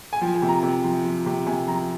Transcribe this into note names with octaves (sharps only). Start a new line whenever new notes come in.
G#5
F3 G5
G#5
C3
A#5
C3
F3
F3
C3
C3 G#5
F3 A#5